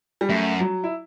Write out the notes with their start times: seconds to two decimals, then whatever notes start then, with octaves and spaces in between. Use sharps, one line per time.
0.21 G3
0.29 F#2 A3
0.60 F#3
0.84 E4